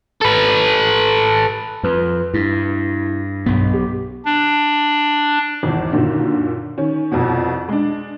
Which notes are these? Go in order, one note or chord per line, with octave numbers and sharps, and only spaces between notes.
A4 B4
F2 B4
G2 E4
B1 G2 B3
G4
D4
G#1 E2
F#2 A#2 D3 D#3
D#3 C#4
C2 F2 B2
G#3 D4